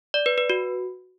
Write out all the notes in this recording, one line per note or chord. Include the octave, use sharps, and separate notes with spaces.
D5
B4
B4
F#4